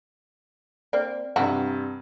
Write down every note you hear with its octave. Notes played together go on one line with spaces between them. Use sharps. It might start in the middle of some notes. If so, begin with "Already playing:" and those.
A#3 C4 D5
G2 C3 E3 F#4 A#5